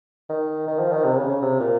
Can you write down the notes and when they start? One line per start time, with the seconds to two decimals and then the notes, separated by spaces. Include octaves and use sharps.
0.29 D#3
0.68 D#3
0.79 F3
0.92 D#3
1.04 C3
1.17 C#3
1.29 C#3
1.42 C3
1.60 A#2